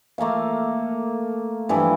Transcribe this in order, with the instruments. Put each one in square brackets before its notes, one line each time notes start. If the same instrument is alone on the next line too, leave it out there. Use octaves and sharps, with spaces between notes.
[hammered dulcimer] A3 A#3 A4 F5
G2 E3 F3 E4